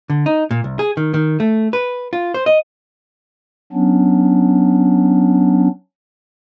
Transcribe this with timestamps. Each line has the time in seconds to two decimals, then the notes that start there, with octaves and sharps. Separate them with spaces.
0.10 D3
0.26 D#4
0.51 A#2
0.64 C2
0.79 G#4
0.97 D#3
1.14 D#3
1.40 A3
1.73 B4
2.13 F4
2.34 C5
2.46 D#5
3.73 F#3 B3 C#4 D4